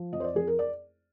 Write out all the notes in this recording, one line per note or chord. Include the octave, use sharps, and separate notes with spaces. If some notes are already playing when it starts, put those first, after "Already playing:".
Already playing: F3
F2 D#5
C5
D5
F2 G#4
A#4
D5